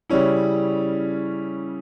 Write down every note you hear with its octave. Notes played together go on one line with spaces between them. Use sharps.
C#3 G3 C#4 E4